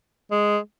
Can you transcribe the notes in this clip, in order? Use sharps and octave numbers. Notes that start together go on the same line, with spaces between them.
G#3